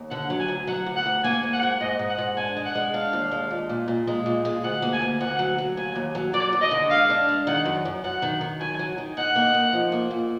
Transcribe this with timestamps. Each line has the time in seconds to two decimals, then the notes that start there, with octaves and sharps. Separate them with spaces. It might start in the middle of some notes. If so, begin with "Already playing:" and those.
Already playing: D#2
0.11 D3 F#5
0.30 F#3
0.39 G#5
0.48 D2
0.67 F#3 F#5
0.86 D2
0.96 F#5
1.06 D2
1.24 A#3 G#5
1.43 G#2
1.53 F#5
1.62 G#2
1.81 G#2 D#5
1.99 G#2
2.09 F#5
2.18 G#2
2.37 D4 G#5
2.57 G#3
2.65 F#5
2.75 G#3
2.94 D4 F5
3.13 D#2
3.32 G#3
3.51 A#2
3.69 A#2
3.88 A#2
4.07 G#3
4.26 A#2
4.45 G#3
4.64 D2 F#5
4.82 A#3
4.93 G#5
5.02 D2
5.21 D2 F#5
5.39 F#3
5.58 F#3
5.77 D#2 G#5
5.95 D#2
6.15 F#3
6.34 F#3 D5
6.53 D#2
6.61 D#5
6.71 D3
6.90 G#3 F5
7.10 D4
7.29 G#3
7.47 D#3 F#5
7.65 F#2
7.85 F#2
8.04 F#2 F#5
8.22 D#3
8.41 D#3
8.60 F#2 G#5
8.79 F#3
8.98 D#3
9.17 D#4 F#5
9.36 A#3
9.54 D#4
9.73 F3
9.92 A#3
10.11 A#2